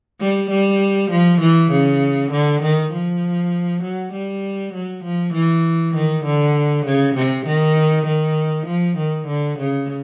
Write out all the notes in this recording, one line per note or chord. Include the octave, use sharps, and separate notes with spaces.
G3
G3
F3
E3
C#3
D3
D#3
F3
F#3
G3
F#3
F3
E3
D#3
D3
C#3
C3
D#3
D#3
F3
D#3
D3
C#3